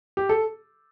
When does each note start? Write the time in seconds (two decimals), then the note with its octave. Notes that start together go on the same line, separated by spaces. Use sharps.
0.17 G4
0.29 A4